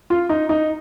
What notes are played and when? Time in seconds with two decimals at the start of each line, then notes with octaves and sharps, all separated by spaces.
0.10 F4
0.29 D#4
0.49 D#4